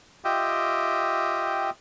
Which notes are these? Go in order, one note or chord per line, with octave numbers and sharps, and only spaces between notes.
F4 G4 D#5 E5 G5